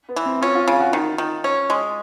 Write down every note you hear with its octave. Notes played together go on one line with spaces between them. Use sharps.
B3
E3
C4
C#4 F4
F4
C#3 F4
F#4
D#3 F4
D#3
C#4
G#3